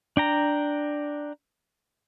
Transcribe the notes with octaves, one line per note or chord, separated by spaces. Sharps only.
D4 G5 A#5